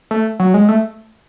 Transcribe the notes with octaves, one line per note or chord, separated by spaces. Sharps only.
A3
F#3
G#3
A3